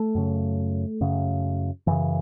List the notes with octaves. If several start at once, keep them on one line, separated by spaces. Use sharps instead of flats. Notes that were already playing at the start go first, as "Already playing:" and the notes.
Already playing: A3
F#2 C#3
F#2 C#3
F#2 C#3 E3